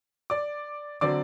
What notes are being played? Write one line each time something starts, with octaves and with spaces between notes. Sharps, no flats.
D5 D6
D3 F#3 C4 D5 D6